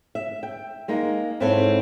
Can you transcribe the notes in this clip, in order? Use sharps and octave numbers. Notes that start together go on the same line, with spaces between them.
E5
G5
G#3 A#3 D#4
G#2 C4 E4 A4 C#5